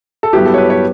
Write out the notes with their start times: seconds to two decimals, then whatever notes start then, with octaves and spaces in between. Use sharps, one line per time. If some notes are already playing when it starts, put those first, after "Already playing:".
0.23 A4
0.33 G2 F#3 B3 E4 G4
0.46 A4
0.54 C#5
0.58 B4
0.70 C#5